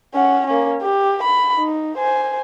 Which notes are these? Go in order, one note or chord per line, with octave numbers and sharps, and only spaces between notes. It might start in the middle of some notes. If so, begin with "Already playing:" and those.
C#4 F#5
A#3 C#4
G4
B5
D#4
C5 G#5